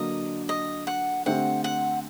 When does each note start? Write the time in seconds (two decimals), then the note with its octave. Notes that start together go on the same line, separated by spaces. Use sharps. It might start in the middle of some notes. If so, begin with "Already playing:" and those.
Already playing: D3 F#3 A#3 D4 D#5
0.49 D#5
0.87 F#5
1.26 D3 A3 C4 G4 C5 F#5
1.64 F#5